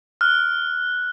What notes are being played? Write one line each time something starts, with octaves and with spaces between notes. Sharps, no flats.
F6 F#6